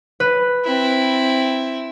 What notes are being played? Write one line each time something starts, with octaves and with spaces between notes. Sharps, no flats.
B4
C4 E4